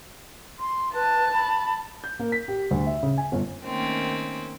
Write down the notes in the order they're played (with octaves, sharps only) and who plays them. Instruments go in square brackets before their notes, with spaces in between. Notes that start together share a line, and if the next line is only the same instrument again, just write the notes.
[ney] C6
[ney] B4 [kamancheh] A5
[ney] B5
[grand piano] G6
A#3
B6
G4
D2
E5
C#3
G#5
G1
[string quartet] D#3 A3 A#3 C4 C#4